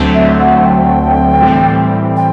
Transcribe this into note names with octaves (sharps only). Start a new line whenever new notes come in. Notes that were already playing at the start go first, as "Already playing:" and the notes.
Already playing: D2 D3 F#3 A3 C4
E5
F#5
G5
A2 E3 G3 C4
G5